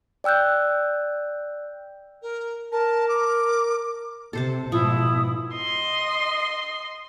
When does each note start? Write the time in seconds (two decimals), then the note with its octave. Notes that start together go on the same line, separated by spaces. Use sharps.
0.24 D5 G5 E6 F#6 G6
2.22 A#4
2.72 A#4 A5
3.09 D6
4.33 C3 A4 C5 A5
4.72 G#2 B2 F3 E4 D#6
5.54 D#5 C6